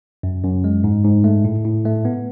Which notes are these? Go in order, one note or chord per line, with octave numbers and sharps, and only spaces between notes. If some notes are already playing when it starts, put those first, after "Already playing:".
F#2
F#2
G#3
G#2
G#2
A3
A2
A2
A3
B3